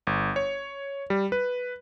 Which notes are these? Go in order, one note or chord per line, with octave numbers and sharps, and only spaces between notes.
G1
C#5
G3
B4